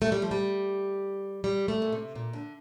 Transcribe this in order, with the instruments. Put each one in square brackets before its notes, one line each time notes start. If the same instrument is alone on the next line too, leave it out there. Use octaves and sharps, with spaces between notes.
[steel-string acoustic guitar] A3
G3
F3
G3
G3
A3
A#2
C3
A#2
D3